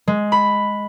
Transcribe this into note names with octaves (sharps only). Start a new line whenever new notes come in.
G#3
B5